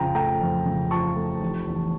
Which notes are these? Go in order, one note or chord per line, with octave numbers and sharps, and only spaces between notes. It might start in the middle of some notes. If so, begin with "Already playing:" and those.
Already playing: F2 C#3 F3 G5 A#5
A3 G5 A#5
F2
C#3
F3 A5 C#6
A3
F1
E2